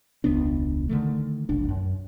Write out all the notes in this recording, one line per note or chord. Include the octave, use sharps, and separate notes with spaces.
E1 C#2 B3 D4
D3 D#3 A3
F1 B1 D4
F#2